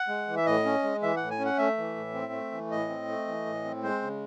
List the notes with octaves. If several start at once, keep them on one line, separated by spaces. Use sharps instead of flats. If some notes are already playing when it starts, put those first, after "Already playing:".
Already playing: F#5
G#3
E3
E5
A2 D#5
C#4
G#3
E3 E5
A2 F#5
G#5
C#4
F#5
A3 E5
E3
A2
C4
A3
E3
A2 D#5
C4
A3
E3
A2
C4
G#3 C5
C#3